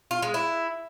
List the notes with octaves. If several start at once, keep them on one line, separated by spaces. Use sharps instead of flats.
F4
G#3
E4